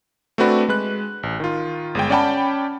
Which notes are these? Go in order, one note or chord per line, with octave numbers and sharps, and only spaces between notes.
A3 C4 D4 F#4 B4 D5
G#3 B4 F#6
A1
D#3 F4
G1 G#3 G5
C#4 D5 F#5 G5 A5 B5